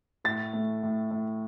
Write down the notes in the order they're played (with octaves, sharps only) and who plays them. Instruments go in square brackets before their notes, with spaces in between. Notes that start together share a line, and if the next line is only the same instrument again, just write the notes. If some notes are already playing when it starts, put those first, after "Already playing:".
[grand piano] A2 A6
A3
A2
A2